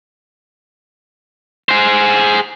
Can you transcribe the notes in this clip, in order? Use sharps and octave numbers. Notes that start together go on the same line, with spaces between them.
G#4 C5